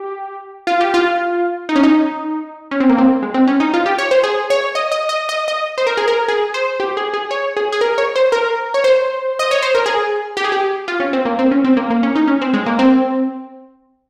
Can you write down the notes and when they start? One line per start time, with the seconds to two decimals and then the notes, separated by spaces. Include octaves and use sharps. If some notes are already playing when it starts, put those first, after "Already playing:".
Already playing: G4
0.67 F4
0.81 G4
0.94 F4
1.69 D#4
1.76 C#4
1.83 D#4
2.71 C#4
2.80 C4
2.89 A#3
2.98 C4
3.23 G#3
3.34 C4
3.47 C#4
3.60 D#4
3.74 F4
3.86 G4
3.98 C#5
4.11 C5
4.23 G#4
4.50 C#5
4.75 D#5
4.92 D#5
5.09 D#5
5.29 D#5
5.48 D#5
5.78 C5
5.87 A#4
5.97 G#4
6.08 A#4
6.28 G#4
6.54 C5
6.80 G4
6.97 G#4
7.14 G#4
7.31 C#5
7.56 G#4
7.72 G#4
7.81 A#4
7.98 C#5
8.16 C5
8.32 A#4
8.74 C#5
8.84 C5
9.39 D#5
9.51 C#5
9.62 C5
9.75 A#4
9.86 G#4
10.37 G4
10.44 G#4
10.52 G4
10.88 F4
11.00 C#4
11.13 C4
11.25 A#3
11.39 C4
11.51 C#4
11.65 C4
11.77 A#3
11.90 A#3
12.03 C#4
12.15 D#4
12.27 C#4
12.41 C4
12.54 G#3
12.66 A#3
12.79 C4